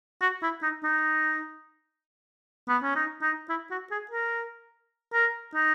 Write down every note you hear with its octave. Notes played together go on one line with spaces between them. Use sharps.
F#4
E4
D#4
D#4
B3
C#4
D#4
D#4
E4
F#4
G#4
A#4
A#4
D#4